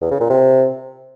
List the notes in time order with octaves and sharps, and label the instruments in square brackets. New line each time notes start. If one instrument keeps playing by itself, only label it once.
[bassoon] E2
C#3
A#2
C3